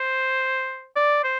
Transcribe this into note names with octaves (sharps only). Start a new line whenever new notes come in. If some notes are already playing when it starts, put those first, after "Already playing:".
Already playing: C5
D5
C5